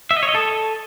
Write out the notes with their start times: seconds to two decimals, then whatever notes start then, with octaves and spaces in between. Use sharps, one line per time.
0.11 E5
0.17 D#5
0.23 C#5
0.29 D#5
0.35 A4